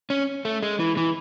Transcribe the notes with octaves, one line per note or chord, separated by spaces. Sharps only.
C#4
A3
G#3
E3
E3